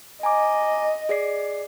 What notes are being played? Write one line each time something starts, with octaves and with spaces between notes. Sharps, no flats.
D#5 G#5 A#5 D6
G#4 D5 C7